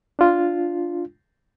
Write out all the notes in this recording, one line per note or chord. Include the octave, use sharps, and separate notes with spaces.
D4 F4